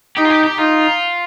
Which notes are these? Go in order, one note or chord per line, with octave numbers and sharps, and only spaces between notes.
D#4 G4
F4
G4
G4
D#4 F4